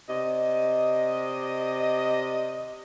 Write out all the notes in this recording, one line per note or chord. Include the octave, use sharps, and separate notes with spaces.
C3 D5 D#5